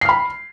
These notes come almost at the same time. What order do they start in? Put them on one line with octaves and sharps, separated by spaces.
C7 F6 B5